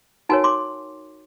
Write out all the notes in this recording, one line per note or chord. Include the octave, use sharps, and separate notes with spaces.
D#4 F#4 A#4 C#5 F#5 G#5
C6 D6